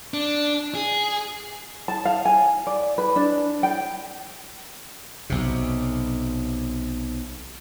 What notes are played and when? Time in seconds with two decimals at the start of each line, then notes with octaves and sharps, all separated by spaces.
0.14 D4
0.75 G#4
1.88 A5
2.05 F5
2.25 G#5
2.67 D5
2.98 B4
3.16 D4
3.63 G5
5.30 B1 C3